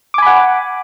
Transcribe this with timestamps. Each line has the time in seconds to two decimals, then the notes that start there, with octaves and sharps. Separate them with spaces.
0.14 D6
0.18 G#5
0.22 B5
0.26 F#5